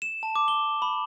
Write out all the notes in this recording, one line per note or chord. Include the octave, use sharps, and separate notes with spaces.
E7
A5
D6
G7
B5